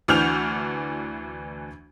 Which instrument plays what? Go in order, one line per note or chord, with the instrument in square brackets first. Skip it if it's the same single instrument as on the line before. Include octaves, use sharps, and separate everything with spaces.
[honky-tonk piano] D2 E3 D4 F6 G6 F7